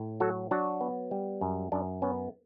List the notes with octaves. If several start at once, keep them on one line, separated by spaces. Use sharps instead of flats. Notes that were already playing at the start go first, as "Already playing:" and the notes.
Already playing: A2
F#3 F#4 A4
F#3 D4 F#4
B3
G3
F#2
F#2 D4
B3 C#4